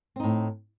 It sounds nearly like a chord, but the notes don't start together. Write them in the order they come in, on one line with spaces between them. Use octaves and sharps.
C4 D#4 A2